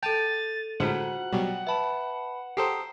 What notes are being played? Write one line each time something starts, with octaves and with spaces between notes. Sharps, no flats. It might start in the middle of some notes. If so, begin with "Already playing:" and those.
A4 G5 A5 G6 A6 D#7 F7
A2 D3 G#3 F4 F#4 C5 F#5
B2 F#3 G3 G5
B4 E5 A5 B5 E7
G4 A4 C5 G5 A#5 D#6 C7